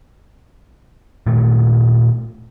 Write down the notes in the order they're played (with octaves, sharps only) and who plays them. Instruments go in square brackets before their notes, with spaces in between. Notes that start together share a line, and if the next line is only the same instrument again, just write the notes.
[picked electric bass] A#2 D#3 A3